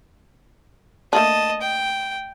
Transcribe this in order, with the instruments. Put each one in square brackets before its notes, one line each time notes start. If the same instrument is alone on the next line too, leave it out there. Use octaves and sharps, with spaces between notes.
[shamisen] A3 A#3 D4 [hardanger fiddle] D#5 A5
[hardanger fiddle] G5